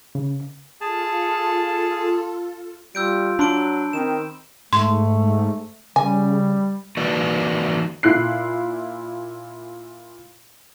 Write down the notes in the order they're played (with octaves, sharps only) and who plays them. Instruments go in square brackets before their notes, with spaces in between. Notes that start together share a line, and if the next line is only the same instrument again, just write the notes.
[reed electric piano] C#3
[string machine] F4 A4 [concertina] G#4 A5
[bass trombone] G3 [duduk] F4 [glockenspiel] E6 G6 D7
[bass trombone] F#3 [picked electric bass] D4 [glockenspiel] B5 C6 D7
[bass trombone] D#3 [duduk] C4 [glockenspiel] E7
[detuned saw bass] G#2 [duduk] A3 [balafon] C6
[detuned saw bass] C#3 [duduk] G3 [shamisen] G#5
[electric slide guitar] E3 A#3 D#4 F#4 B4 D5
[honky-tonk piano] A#2 E4 F#6 C7